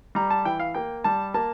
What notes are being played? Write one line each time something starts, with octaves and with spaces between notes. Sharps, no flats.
G3 A#5
A5
E3 G5
F5
A#3 G5
G3 A5
A#3 A5